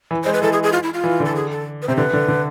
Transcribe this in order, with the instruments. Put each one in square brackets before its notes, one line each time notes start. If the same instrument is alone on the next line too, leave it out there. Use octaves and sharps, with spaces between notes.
[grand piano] E3
[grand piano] G#3 [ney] C5
[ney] B4
[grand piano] E3 [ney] A4
[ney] G#4
G#4
F4
E4
F4
[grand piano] E3
D3
[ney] A4
G#4
A4
B4
[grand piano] C3 [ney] C5
[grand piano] D3 [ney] B4
[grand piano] D3
D3